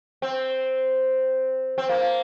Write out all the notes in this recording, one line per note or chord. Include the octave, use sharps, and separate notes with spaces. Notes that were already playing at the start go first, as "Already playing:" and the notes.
C4
C4
A#3